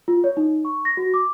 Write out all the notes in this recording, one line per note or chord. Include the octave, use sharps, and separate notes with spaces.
F4
C#5
D#4
C#6
A#6
F#4
D6